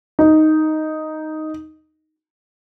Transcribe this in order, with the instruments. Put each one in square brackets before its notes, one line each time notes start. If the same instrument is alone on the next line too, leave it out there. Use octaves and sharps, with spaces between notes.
[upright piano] D#4